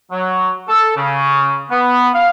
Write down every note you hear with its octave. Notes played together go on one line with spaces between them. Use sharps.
F#3
A4
C#3
B3
F5